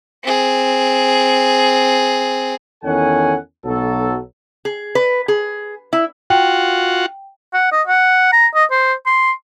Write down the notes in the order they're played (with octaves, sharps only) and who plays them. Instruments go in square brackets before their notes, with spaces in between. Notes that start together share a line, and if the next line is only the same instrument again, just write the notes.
[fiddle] C4 G#4
[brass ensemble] E2 D#3 C#4 A4 F#5 G#5
B1 F#3 A4
[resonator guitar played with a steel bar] G#4
B4
G#4
E4
[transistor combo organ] F4 F#4 F#5 [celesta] G5
[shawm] F#5
D#5
F#5
A#5
D#5
C5
C6